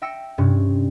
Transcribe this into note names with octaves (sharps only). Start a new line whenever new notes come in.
E5 G5 E6 A#6 C#7
G2 C3 C#4